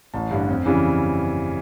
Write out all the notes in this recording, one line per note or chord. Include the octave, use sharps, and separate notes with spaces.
A1 A5
G2 D3
F2
C#3 E3 G3